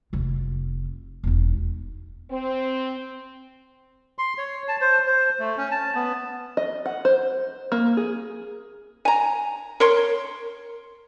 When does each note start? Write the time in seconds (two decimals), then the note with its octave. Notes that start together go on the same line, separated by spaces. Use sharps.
0.13 F1 F4
1.24 E1 D#4
2.31 C4
4.18 C6
4.38 C#5
4.68 A5
4.81 C5
5.07 C5
5.39 A3
5.58 C#4
5.71 A5
5.95 B3
6.57 D#5
6.86 F#5
7.05 C5
7.72 A#3
7.97 G#4
9.05 G#5 A#5
9.80 A#4 C#5 C6